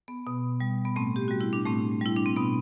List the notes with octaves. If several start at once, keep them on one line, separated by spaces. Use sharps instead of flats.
B3
B2 B3
G3
B3
A2 A3 C4
G4
G3 F#4
E4
D4
A2 A3 C4
G3 E4
D4
C4
B2 B3